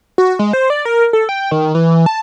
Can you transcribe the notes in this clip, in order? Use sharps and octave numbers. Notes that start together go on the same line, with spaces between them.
F#4
G#3
C5
D5
A#4
A4
G5
D#3
E3
A5